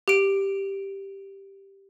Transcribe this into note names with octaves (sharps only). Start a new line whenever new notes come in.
G4 D7